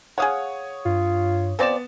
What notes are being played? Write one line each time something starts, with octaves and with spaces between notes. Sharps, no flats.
G#4 C#5 F5 F#5 D#6
G2 F4
F3 B3 C4 D5 A6 E7